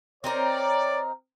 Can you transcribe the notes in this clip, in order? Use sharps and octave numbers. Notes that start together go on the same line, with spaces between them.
C4 D#4 A#4 C#5 D5